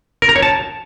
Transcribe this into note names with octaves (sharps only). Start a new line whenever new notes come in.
A#4
A#5
C#5
A5